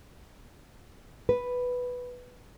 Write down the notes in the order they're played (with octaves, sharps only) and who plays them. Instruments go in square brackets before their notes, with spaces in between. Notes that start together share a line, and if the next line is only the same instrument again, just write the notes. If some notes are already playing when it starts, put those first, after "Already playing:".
[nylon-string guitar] B4